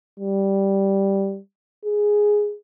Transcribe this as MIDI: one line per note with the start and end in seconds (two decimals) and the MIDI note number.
0.19 1.39 55
1.85 2.55 68